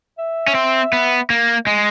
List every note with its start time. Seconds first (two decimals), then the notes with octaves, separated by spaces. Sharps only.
0.18 E5
0.48 C#4
0.55 C4
0.93 B3
1.30 A#3
1.67 G#3 D#5